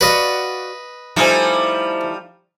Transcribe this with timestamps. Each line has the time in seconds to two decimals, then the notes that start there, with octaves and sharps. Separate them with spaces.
0.01 F#4 B4 D5 D#5 F5
1.16 F3 G3 A3 D#4 E4 C5 E5 G#5